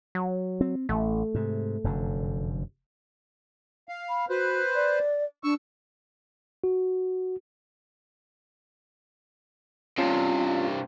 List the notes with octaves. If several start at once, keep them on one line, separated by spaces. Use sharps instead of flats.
F#3
C4
A1 A3
G#2 C3
F1 F#2 D3
F5
B5
F#4 B4 C5
D5
D4 C#6 E6
F#4
G2 C3 C#4 F4 A5